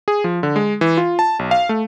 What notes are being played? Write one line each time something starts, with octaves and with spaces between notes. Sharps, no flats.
G#4
F3
D3
G#3
E3
F4
A5
B1
F5
A3